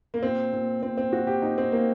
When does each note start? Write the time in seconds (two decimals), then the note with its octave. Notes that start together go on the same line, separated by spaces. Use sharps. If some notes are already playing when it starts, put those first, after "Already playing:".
0.14 A#3
0.23 A#2 C4
0.53 A#2
0.82 A#2 C4
0.97 C4
1.13 A#2 F#4
1.27 G4
1.42 A#2 D#4
1.58 C4
1.72 A#2 A#3